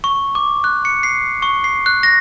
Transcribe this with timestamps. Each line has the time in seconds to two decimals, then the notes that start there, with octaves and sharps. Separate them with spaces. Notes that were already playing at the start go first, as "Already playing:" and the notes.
0.04 C#6
0.35 D6
0.64 F#6
0.85 C#7
1.03 C7
1.42 C#6
1.64 C7
1.86 F#6
2.03 A#6